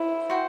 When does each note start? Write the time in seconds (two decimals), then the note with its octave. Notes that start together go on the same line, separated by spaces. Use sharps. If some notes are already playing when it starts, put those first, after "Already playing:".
Already playing: E4 C5
0.30 F#4 C5 G5